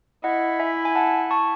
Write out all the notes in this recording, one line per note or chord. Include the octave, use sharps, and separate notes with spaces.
E4 D#5 F#5
E5 G#5
G#5
F#5 A5
A5 C#6